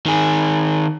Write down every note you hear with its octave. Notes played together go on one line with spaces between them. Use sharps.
D#3 G#4